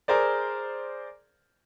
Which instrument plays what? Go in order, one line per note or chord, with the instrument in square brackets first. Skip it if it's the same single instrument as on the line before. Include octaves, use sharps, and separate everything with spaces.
[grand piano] G#4 A#4 C5 D5